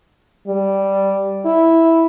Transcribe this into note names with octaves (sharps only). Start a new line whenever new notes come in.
G3
E4